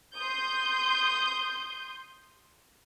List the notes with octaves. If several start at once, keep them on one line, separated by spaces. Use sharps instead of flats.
C6 D#6 G6